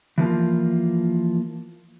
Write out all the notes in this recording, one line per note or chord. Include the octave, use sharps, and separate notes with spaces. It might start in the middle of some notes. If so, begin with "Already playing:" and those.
E3 F3 A#3 F4